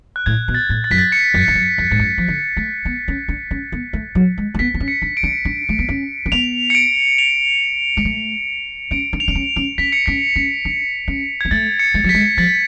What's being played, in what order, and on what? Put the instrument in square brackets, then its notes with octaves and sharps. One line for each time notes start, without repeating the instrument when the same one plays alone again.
[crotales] F#6
[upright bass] A2 [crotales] G#6
[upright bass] B2
[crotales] A6
[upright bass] A2
[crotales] A6
[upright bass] F#2 [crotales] B6
[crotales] A6
C#7
[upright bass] F#2
F2
F#2
F2
G#2
F#2
F3
D3
A3
B3
C#4
D4
C#4
B3
A3
F#3
G#3
A3
[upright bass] B3 [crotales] B6
[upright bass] B3
C#4
[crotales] C#7
[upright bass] D4
[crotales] D7
[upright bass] D4
D4
A3
B3
C#4
C#4
[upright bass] B3 [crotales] F7
[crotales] C#7
D7
F7
[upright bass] G#3
A3
[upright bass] C#4 [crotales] D7
[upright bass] D4
[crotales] F7
[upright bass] D4
C#4
C#4
[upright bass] C#4 [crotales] B6
[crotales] C#7
[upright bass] C#4 [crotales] B6
[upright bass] C#4
D4
C#4
[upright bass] B3 [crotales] G#6
[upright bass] A3 [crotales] A6
[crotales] C#7
[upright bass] G#3
F#3
[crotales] B6
[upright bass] G#3
[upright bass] F3 [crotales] A6